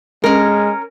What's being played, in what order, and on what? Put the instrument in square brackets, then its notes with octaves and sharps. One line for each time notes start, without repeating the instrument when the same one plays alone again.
[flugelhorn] G#3 [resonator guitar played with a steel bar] C#4 A#4